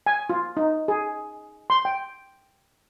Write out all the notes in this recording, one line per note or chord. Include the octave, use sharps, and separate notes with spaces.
G#5
F4
D#4
G#4
C6
G5